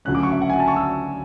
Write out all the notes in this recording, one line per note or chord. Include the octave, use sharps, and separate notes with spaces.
D2 C#3 F#3 A3 C#4 F#6
D6
C#6
E5
F#5
G#5
A5
C#6
E6